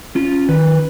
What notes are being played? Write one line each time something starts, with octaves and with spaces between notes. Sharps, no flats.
C#4 F4
D#3 B4